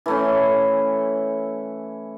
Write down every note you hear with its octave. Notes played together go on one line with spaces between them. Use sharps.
E3 A3 C#4